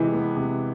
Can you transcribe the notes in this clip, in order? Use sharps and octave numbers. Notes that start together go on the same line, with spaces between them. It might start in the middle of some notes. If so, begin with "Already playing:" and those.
Already playing: C3 E3 G#3
B3
C3